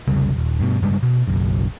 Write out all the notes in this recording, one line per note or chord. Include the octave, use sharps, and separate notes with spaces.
F1 C2 C#3 G3
D#1
G2 B2
G2 C#3 G3 G#3
B2
F#1 B1 F#2